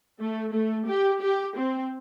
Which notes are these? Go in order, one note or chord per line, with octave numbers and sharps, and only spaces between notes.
A3
A3
G4
G4
C4